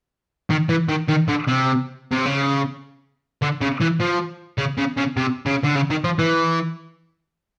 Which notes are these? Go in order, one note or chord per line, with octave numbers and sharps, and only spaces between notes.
D#3
E3
D#3
D#3
D3
C3
C3
C#3
D3
C#3
E3
F3
C#3
C#3
C#3
C3
C#3
D3
C#3
D#3
F3
E3